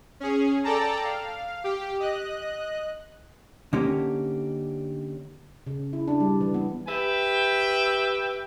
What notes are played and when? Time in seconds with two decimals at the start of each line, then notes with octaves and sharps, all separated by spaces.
0.20 C#4 G#4
0.64 A4 D5 G5 A5 A#5
1.04 F5
1.64 G4
2.00 D#5 F#6
3.73 D3 A#3 C#4 D#4 G4
5.67 C#3
5.93 E4
6.08 D4
6.20 G3
6.41 E3
6.54 B3
6.88 G4 B4 E5 G5